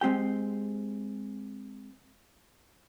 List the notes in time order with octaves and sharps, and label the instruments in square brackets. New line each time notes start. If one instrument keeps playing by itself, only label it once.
[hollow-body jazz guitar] G#3 C4 G4 G5